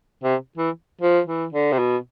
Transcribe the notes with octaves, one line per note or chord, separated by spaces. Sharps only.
C3
E3
F3
E3
D3
C3
B2